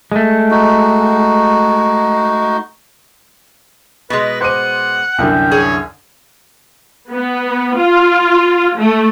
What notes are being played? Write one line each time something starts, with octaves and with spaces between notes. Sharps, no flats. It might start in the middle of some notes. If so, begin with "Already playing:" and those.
G#3 A3
D#4 F#4
B2 G#3 B4
C5 F#5 D6 D#7
C2 F#2 D3 G5
G#4 C#5
B3
F4
A3